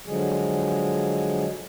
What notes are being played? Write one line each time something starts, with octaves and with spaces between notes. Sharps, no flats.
D3 F3 F#3 G#3 G#4